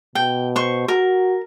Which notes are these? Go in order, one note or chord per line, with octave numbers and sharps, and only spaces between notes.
B2 G5
C5 C#6
F#4 A#4